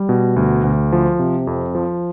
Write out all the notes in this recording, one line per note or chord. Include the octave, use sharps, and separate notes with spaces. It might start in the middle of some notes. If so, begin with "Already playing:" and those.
Already playing: G3
B2
D2
D2
F3
C3
F2
F3